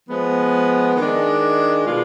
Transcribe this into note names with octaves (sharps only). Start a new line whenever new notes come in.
F3 G#3 B3
D#3 G#3 D4
B2 G#3 D4 F4